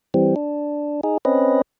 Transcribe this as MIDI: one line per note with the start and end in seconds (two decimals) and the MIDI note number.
0.14 0.35 52
0.14 0.35 55
0.14 0.35 60
0.36 1.01 62
1.03 1.18 63
1.03 1.18 68
1.25 1.62 60
1.25 1.62 61
1.25 1.62 71
1.25 1.62 75